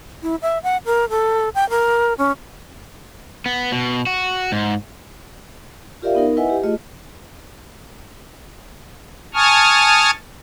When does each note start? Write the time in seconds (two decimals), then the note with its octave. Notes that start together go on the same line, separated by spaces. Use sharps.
0.22 E4
0.42 E5
0.63 F#5
0.85 A#4
1.10 A4
1.55 G5
1.70 A#4
2.18 C#4
3.46 B3
3.72 B2
4.07 F#4
4.52 G#2
6.02 F4 G4 A#4 D5 E5 F5
6.15 B3 D#4 A#4
6.37 E4 B4 D#5 E5 F#5 G#5
6.50 G4
6.63 A3 F4 G#4 D#5
9.34 G#5 A5 C#6 D#6 F6